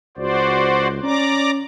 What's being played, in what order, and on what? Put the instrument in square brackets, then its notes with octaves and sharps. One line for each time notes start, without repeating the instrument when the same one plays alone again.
[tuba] C#2 [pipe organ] F#4 C5 D5
[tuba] C#4 [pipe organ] D5 A#5 D6